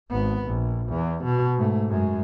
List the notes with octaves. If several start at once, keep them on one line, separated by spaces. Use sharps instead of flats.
G#1 B3
A#1
E2
B2
G#2 A3
F#2 G#3